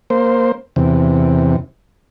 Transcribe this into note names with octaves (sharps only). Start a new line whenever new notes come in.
A#3 C5
E2 C3